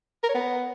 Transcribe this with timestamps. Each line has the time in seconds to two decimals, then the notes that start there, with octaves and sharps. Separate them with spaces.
0.23 A#4
0.29 C#5
0.35 B3